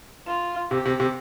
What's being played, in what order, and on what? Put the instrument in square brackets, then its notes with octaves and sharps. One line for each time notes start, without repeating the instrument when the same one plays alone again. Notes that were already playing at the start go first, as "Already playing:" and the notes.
[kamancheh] F4
[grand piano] C3 [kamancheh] G4
[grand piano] C3
C3